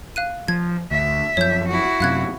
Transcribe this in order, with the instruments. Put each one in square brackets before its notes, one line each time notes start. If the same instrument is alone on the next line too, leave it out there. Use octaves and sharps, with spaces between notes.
[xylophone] F5 F#6 D#7
[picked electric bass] F3 [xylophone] G#6
[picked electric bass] D2 [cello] E5
[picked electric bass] F#2 F3 [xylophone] C#5 G6
[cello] E4 F#4
[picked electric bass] F#2 C3 [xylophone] F5 F#6 G#6